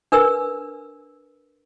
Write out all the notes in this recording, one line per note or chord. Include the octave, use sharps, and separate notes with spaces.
D4 A#4 B4 E6